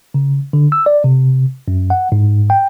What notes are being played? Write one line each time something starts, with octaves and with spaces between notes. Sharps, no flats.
C#3
D3
E6
D5
C3
F#2
F#5
G#2
G5